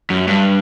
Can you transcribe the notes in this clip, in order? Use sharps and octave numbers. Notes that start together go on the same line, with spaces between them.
F#2
G2